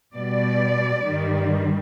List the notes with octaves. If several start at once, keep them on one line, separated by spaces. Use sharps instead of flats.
B2 G3 D5
G2 D#3 G3